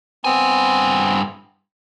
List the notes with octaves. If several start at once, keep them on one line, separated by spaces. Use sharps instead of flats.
G2 B3 C4 G#5